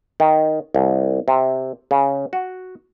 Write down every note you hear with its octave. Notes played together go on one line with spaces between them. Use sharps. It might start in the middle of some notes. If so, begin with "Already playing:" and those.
D#3
C2
C3
C#3
F#4